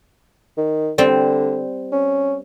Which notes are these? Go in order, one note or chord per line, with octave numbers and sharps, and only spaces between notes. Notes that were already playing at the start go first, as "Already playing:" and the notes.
D#3
D3 G3 C4
C#4